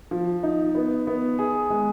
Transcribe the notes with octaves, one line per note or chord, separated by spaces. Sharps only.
F3
D#4
B3
B3
G#4
G#3